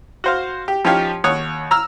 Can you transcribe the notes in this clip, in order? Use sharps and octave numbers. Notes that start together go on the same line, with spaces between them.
F#4 C5 F5
G4
F3 C#4 D#4 G4 C#5 F5
D#2 C#5 F#5 D#6
A#5 E6 F6